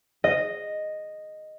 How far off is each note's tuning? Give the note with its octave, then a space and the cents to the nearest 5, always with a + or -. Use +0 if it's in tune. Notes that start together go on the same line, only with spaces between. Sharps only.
D#5 -5